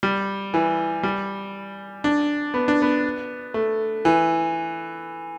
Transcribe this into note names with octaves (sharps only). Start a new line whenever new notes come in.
G3
E3
G3
D4
B3
D4
B3
A3
E3